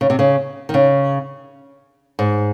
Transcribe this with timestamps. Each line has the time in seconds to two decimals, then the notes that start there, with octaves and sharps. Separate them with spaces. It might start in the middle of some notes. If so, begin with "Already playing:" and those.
0.01 C#3
0.10 C3
0.19 C#3
0.69 D#3
0.74 C#3
2.19 G#2